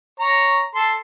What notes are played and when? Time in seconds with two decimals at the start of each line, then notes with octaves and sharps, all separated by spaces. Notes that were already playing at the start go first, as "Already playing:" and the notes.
0.20 C#5 A#5
0.75 A4 C6